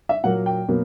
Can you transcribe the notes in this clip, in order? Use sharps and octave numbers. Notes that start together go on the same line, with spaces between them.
E5
A#2 F#3 A#3 F#5
G5
B2 F#3 A#3